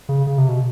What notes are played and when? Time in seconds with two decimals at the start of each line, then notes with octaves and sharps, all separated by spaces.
0.09 C#3
0.27 C#3
0.38 C3
0.49 B2